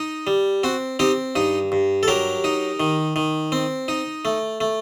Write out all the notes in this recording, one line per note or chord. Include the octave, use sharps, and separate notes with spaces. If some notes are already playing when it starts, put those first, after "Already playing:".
Already playing: D#4
G3
C4 F#4
C4 D#4 G4
G2 D#4
G2
A4
F#3 G4 A#4
D#4
D#3
D#3
C4
D#4
A3
A3